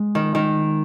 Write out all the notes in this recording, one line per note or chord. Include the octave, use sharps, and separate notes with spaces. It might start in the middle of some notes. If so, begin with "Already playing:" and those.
Already playing: G#3
D#3
D#3